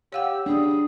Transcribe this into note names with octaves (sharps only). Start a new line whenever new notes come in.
G4 C#5 F5 F#5 E6
G3 D4 G#4